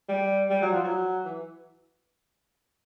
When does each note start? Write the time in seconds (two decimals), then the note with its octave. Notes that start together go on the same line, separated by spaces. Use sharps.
0.09 G3
0.50 G3
0.62 F#3
0.72 F3
0.84 F#3
1.25 E3